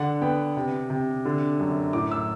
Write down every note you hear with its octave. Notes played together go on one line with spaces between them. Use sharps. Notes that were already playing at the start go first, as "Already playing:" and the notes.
Already playing: D3 F#5
B3 G5
C3
C3
D3
F#2
A2 D6
E6